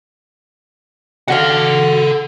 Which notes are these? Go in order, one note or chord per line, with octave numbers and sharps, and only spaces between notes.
F#4 A4 F5 F#5